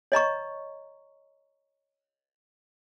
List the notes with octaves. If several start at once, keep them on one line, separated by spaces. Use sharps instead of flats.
C#5 D#5 A#5 C#6